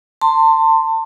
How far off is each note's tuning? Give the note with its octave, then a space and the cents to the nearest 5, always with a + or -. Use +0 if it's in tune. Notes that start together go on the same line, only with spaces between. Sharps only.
A5 +30 C6 +0